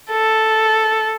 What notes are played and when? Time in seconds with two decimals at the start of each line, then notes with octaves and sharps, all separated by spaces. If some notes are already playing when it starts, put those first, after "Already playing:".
0.11 A4